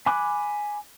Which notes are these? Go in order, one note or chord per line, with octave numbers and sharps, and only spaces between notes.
G#5 B5 D6 F#6